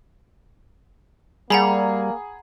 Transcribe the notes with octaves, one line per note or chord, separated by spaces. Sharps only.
G3 A#3 G#4 F#5 A#5 B5